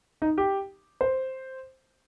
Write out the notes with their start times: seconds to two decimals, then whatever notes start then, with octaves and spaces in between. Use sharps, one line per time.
0.22 D#4
0.38 G4
1.01 C5